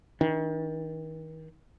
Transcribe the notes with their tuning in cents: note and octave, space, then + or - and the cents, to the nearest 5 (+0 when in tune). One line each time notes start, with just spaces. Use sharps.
D#3 +40 D4 +10